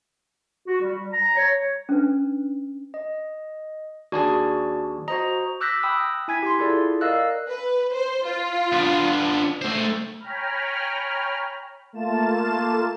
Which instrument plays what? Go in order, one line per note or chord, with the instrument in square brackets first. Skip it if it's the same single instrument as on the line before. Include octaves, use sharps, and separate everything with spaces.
[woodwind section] F#4
G3
A#5
C#5
[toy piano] C#4 D4 B4
[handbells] D#5
[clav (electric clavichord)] D#2 D4 G#4 [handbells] F#4 D5 A5
[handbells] F#4 C5 A#5 [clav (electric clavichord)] D#5
[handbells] D6 E6 F#6 G6 A#6 B6
G5 B5 D#6 E6
E4 G#5 G#6 B6
G4 C6
E4 F4 G#4 A4 D5
A#4 D5 D#5 F5 E6 F#6
[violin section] B4
C5
F4
[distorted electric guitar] B3 D4
A3 C5
[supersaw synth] C#5 G5 G#5 A#5 B5 F6
A3 A#3 F4 A5 E7